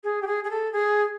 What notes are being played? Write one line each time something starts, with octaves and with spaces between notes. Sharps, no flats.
G#4
G4
G#4
G#4
A4
G#4